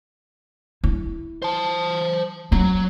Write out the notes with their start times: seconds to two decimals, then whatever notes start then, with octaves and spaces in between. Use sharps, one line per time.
0.84 E4
1.42 C5 A5
2.52 F#3 C#4